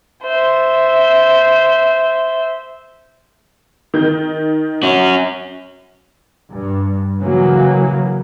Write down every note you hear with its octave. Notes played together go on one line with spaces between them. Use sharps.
C5 E5
D#3 G6
C#4 F#4
G2
C#3 E3 F#3 A#3